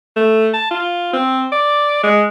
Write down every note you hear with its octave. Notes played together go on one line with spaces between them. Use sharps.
A3
A5
F4
C4
D5
G#3